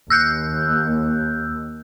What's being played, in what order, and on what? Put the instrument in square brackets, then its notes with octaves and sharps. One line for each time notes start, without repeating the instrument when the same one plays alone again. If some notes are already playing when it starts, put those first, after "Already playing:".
[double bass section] D#2 [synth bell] E6 F#6 G6